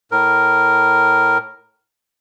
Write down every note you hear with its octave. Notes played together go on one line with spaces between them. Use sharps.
A2 A#4